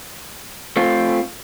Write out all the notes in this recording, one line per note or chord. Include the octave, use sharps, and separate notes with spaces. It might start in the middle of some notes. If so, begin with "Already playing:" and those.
A3 C4 F4